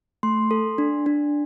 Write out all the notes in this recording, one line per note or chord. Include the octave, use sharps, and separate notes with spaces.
A3 C6
A4
D4
D4